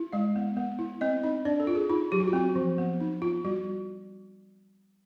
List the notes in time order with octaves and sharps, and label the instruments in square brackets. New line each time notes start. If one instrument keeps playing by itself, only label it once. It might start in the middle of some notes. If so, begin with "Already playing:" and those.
Already playing: [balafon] E4
G#3 F5
B3
B3
E4
C4 D#5
D#4 D#5
D4 D5
A4
F4
G#4
D#4 F4
F#3 G4
F#4
F4
C4 F#4
F3
B3
D#4
F4
G3 F#4